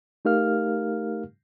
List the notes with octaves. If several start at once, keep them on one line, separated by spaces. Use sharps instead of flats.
A3 D#4 G4 A#4 F5 F6